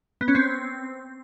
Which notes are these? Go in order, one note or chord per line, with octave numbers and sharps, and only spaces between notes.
B3
C#4
C4